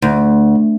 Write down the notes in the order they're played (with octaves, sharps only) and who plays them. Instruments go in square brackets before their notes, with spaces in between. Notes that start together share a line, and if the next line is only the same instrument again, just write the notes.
[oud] D2